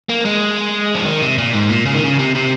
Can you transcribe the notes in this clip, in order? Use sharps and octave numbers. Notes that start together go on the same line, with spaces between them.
A#3
G#3
F3
D#3
C3
A#2
G#2
A#2
C#3
D#3
C#3
C3
C3